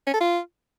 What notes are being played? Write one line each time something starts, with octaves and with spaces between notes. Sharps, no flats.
C#4
A4
F4